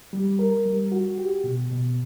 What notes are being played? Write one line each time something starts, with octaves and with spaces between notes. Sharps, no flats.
G3
A#4
G3
F#4
G4
B2
B2